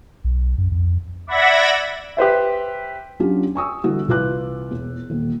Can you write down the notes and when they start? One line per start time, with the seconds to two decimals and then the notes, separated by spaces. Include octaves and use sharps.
0.24 B1
0.58 F#2
0.72 F2
1.27 D5 E5 F#5 B5 G#6 A#6
2.17 G4 B4 C5 E5
3.20 F#3 C#4 D4 F4 G4
3.55 G#5 C#6 D#6 E6
3.83 D3 E3 G3 F#4
4.08 C2 E3 F4 B4 D6 F#6
4.71 E1 E2
5.10 D#1